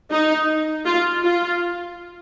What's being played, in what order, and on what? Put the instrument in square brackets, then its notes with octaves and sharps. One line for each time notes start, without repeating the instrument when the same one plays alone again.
[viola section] D#4
F4
F4